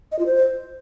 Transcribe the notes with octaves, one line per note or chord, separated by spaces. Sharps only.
D#5
F4
C5